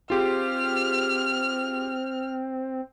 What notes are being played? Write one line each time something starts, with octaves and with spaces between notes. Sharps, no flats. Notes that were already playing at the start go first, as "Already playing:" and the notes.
C4 F4 G4 G#4 F6